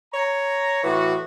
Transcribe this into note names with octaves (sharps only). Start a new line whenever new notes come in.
C#5 A#5
A2 E3 F#4